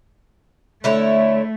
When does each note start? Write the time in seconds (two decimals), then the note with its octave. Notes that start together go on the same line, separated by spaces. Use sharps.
0.84 D3 A3 E4 C#5